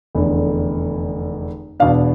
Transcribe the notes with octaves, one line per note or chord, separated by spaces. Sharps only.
F1 E2 D3
E2 B2 B3 D4 F5